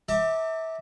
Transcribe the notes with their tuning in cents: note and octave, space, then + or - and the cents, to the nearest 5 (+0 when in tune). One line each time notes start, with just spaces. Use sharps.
E5 -30 A5 +40 D6 +0